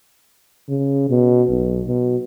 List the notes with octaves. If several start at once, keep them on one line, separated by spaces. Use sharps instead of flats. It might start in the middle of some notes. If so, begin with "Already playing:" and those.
C#3
B2
B1
B2